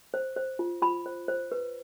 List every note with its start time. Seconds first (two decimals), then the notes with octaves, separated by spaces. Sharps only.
0.14 C5
0.36 C5
0.59 F4
0.82 F4 B5
1.06 C5
1.28 C5
1.52 B4